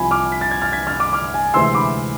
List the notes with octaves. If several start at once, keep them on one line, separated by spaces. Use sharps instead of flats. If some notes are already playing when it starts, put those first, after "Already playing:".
Already playing: C2 C3 F3 G#5 B5
D6 F6
B6
A6
G#6
F6 A6
G#6 B6
F6 A6
D6 F6
D6 F6
G#5
D2 C3 E3 G#3 C4 C6 E6
B5 D6